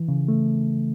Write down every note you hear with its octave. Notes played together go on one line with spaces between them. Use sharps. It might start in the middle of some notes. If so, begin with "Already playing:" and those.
Already playing: E3
C#3
A3